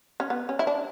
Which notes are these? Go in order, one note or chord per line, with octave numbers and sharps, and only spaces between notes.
C#4
B3
C#4
E4
D4